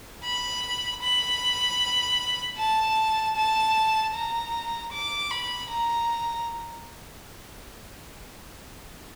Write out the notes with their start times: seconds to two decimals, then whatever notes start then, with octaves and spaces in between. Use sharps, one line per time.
0.24 B5
1.02 B5
2.58 A5
3.36 A5
4.15 A#5
4.92 D6
5.31 B5
5.70 A#5